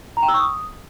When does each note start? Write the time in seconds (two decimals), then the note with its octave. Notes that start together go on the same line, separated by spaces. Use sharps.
0.17 A#5
0.23 G5
0.28 E6
0.34 C#6
0.40 D#6